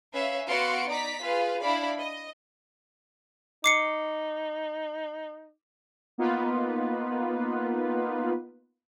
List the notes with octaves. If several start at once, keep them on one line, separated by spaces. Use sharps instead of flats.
C#4 B4 E5 F5
B3 F#4 F5 C6 C#7 D7
D#4 D5 A#5 B6
F4 G#4 B4 F5
D4 E4 D5 F5 B5
D#5
D#4 D6 C7 C#7
A#3 B3 D#4 F4 B4